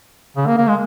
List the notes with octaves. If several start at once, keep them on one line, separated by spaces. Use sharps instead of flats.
C#3
A#3
A#3
G#3